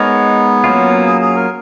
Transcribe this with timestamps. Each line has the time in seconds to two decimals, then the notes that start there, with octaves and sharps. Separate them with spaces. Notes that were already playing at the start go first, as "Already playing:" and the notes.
Already playing: G#3 B3 D#4 A#4 C#5
0.64 F#3 A#3 C#4 F4
1.06 G#4
1.21 G#4
1.35 A#4